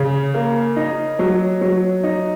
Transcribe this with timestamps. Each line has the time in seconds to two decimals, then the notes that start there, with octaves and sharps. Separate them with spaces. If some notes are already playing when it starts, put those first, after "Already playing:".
Already playing: C#3
0.34 A#3
0.76 D#4
1.19 F#3
1.61 F#3
2.03 D#4